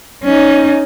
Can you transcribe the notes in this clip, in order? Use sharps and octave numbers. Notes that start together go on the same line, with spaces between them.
C#4 D#4